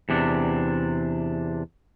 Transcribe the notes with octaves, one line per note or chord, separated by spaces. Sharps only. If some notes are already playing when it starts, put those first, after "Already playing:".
E2 C3 D4